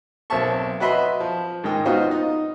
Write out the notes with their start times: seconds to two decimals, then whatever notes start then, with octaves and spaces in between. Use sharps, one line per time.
0.30 B1 A#3 C4 E5 A5 C#6
0.80 F#4 B4 D#5 E5 B5 C6
1.20 F3
1.64 G#2 D#3 G#3 G5 D#6
1.85 B3 D#4 F4 F#4 C5
2.11 D#4